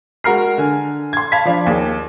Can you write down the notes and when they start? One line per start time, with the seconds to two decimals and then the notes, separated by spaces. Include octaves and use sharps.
0.24 G#3 F#4 A#4 F6 C7
0.58 D3 G#5
1.13 C6 G#6
1.32 F5 A5 B5 G#6 B6
1.45 F3 D4 F5
1.66 D#2 G#4